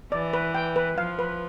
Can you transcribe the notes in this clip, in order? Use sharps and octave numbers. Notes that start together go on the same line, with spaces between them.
E3 D5
B4
G5
B4
F3 F5
B4